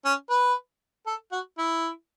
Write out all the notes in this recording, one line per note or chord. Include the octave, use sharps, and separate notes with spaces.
C#4
B4
A4
F#4
E4